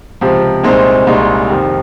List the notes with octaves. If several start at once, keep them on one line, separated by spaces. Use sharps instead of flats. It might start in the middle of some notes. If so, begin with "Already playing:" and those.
C#2 C3 F3
C2 A#2 G#3 C4 D#4
C2 A#2 G#3 D#4
F2 C3 D#3